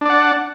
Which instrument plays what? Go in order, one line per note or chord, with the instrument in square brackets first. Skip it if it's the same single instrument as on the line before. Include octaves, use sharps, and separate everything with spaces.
[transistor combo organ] D4
D5
F#5